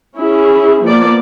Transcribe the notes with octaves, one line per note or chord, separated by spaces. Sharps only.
C#4 E4 G#4
F3 A#3 B3 D5